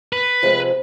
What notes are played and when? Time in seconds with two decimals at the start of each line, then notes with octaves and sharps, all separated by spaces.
0.13 B4
0.42 C3 F3 G#3